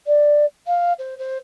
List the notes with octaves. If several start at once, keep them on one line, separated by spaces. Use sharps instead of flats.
D5
F5
C5
C5